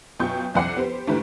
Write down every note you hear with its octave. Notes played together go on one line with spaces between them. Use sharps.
F#2 B2 F4 G5 C#6 G6
C2 F2 F#5 D6 C7
B3 G4 C5
G1 G#2 E3 A3 G4 B4